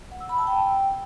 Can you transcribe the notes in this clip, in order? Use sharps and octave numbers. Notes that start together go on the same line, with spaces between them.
F#5
E6
B5
A5
G5